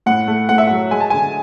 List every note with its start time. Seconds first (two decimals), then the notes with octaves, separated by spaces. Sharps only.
0.06 A2 F#5
0.28 A3
0.49 A2 F#5
0.58 E5
0.67 F#5
0.71 F#3
0.91 G#3 G#5
1.00 A5
1.10 D3 G#5